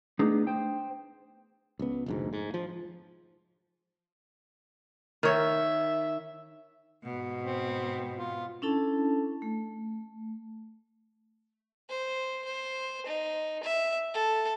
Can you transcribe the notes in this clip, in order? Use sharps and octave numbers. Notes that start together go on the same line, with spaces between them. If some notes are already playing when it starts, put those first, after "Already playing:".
A3 B3 D4 D#4 G#4
C5 G5
C#2 B3
F1 D2 G#2
G#2
F3
D#3 C#5 E5
G#2 B2
C4
F4
C#4 D4 E4 A4 A5
A3
C5
C5
D#4
E5
A4